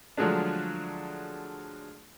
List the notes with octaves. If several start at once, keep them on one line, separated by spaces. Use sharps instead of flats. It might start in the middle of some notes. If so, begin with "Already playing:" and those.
D3 F3 F#3 G#3 A3 D4